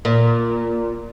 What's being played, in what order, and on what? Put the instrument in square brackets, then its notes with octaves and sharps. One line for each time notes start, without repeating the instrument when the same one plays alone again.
[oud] A#2